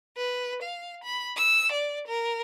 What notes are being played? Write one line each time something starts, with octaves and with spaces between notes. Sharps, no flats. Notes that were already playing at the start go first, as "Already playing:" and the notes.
B4
F5
B5
E6
D5
A#4